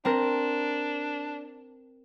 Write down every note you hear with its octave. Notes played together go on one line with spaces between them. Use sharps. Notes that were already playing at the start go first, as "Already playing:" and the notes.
C4 D4 A#4 G6